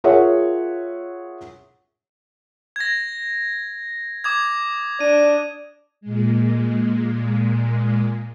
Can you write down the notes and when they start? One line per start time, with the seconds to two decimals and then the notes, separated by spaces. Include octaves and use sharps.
0.04 F4 G#4 A#4 C#5 E5 F#5
2.76 G#6 A#6
4.24 D6 D#6 G#6
5.01 D4 D#7
6.01 A#2 G#3